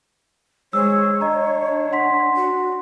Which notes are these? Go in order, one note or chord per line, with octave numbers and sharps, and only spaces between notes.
G#3 C5 C#5 E6
D4 D#5 A#5
F#5 C6 B6
F#4